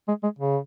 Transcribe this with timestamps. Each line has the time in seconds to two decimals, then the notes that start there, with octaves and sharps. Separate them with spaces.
0.08 G#3
0.23 G#3
0.39 C#3